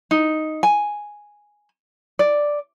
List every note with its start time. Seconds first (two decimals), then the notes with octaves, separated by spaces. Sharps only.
0.11 D#4
0.63 G#5
2.19 D5